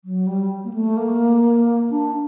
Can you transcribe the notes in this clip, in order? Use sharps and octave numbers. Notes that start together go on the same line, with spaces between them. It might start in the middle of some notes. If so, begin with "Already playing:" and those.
F#3
G3
A#3
A3
A#3
D4